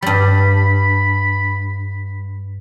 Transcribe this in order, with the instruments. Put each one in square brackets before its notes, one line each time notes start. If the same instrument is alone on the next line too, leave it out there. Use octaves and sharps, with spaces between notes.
[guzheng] G2 G3 [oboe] B5